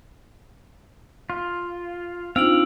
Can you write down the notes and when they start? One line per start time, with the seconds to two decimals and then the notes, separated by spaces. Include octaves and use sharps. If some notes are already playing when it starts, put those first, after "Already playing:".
1.30 F4
2.36 C4 D4 D#4 F4 F5 E6 D7 F#7